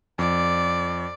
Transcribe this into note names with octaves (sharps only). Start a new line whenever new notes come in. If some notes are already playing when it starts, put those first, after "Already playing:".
F2 D5